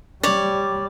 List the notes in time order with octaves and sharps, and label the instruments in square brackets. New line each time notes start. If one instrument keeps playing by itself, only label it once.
[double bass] G3 [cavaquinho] C#5 D5